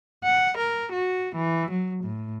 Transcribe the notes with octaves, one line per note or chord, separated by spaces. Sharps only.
F#5
A#4
F#4
E3
F#3
A2